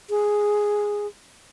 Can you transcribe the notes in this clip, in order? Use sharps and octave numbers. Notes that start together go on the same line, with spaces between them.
G#4